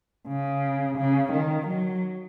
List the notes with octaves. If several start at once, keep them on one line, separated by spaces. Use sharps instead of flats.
C#3
C#3
D#3
F#3